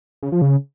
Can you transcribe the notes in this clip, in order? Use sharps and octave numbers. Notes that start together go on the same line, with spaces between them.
C#3
F3
C#3